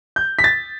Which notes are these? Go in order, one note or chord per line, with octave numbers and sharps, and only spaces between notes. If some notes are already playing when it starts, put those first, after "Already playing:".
G6
B6
A6